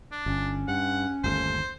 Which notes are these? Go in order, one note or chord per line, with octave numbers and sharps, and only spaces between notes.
D4
G1 C#4
G2 F#5
G1 D#2 A3 C5